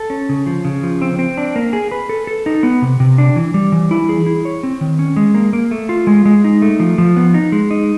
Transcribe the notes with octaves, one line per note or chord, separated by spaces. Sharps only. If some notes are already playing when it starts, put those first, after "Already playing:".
Already playing: A4
C#4
C#3
F3
C#3
F3
C4
C4
D4
A#3
G#4
B4
A4
A4
D#4
B3
C3
C3
D4
E3
G3
E3
E4
G#4
E4
C#5
C4
D#3
C#4
G#3
A#3
A#3
A3
F4
G#3
G#3
D#4
A3
F3
F3
B3
D#4
G#3
D#4